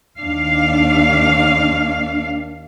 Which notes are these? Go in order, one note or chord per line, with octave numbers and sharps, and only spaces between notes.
D#2 D4 F5